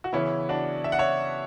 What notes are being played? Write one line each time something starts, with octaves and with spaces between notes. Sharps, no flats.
F#4
C#3 E3 B3 C#4 E4
D4 F#4
E5
F#5
C#5 E5